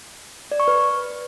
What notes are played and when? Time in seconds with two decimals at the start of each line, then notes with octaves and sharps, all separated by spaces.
0.52 D5
0.60 C#6
0.68 B4